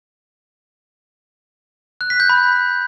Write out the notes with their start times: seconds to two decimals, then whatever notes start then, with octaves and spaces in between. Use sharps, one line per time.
2.01 F#6
2.10 B6
2.20 G6
2.29 B5